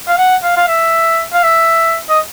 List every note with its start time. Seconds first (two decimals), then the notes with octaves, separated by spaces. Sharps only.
0.09 F5
0.18 F#5
0.44 F5
0.57 F5
0.68 E5
1.34 F5
1.43 E5
2.10 D#5